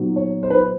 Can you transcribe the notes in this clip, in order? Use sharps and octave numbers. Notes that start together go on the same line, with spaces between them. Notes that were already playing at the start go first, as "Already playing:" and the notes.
Already playing: A#2 F#3 B3 D#4
C#5
C5
B4
C5